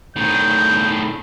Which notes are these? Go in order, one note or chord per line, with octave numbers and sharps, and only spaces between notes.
A2 D#3 G6